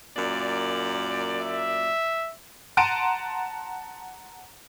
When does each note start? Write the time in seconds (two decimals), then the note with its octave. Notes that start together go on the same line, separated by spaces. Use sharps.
0.17 F#2 A#2 D5
1.41 E5
2.77 F#5 A5 A#5 C6 D7 D#7